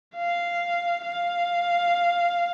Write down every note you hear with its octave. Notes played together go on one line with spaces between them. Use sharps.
F5
F5